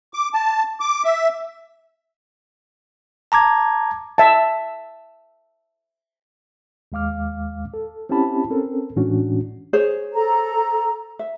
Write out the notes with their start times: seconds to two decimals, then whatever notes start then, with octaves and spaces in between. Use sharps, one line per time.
0.14 D6
0.34 A5
0.80 D6
1.04 E5
3.32 A5 A#5 D6 G#6
4.18 E5 A5
6.92 D#2 G#3 F5 D6 F6
7.74 A4
8.09 C4 C#4 E4 G4 A5 B5
8.50 C4 C#4 A4 A#4
8.96 A2 E3 G#3 C#4 D4 F#4
9.73 G#4 C5 C#5
10.14 A4 A#5
11.19 E5